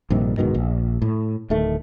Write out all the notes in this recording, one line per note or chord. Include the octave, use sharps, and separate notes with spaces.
A#1 G2 C3 D#3
D1 G#2 B2 D#3
A#1
A2
D1 D#3 A3